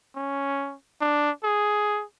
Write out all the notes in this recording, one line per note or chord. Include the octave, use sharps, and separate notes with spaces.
C#4
D4
G#4